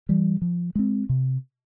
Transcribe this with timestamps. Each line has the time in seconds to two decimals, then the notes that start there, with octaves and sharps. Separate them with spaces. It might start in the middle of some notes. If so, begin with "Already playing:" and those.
0.09 E3 G3
0.42 F3
0.75 G#3 C4
1.09 C3